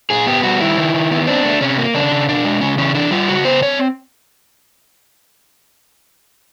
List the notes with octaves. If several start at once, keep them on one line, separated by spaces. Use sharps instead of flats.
A#2 G#4
B3 G4
G3 F#4
D#3 E4
D#3
D#3
B3
C4 D4
A3
C3 C#4
A#3
C#3 D4
C#3
B2 D4
G#3
C#3 C#4
E3 C#4
E3 D4
G3 F4
C#3 F#4
B3 C5
C4 C#5